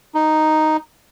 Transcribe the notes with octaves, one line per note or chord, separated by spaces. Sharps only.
D#4